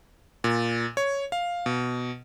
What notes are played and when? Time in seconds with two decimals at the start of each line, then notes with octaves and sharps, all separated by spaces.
0.44 A#2
0.97 C#5
1.32 F5
1.66 B2